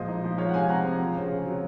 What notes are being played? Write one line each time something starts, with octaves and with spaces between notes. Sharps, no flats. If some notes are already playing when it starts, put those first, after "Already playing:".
Already playing: A#2 F3 G#3 C5 D#5
D#4
F3
G#3 C#5 F5
F#5
C3 F5 G#5
C4 F#5 A#5
F3
C4
C#3
C#3
F#3